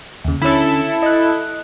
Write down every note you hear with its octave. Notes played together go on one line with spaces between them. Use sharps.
D#2 C#3
D3 C#4 E4 A4
D#5 F#6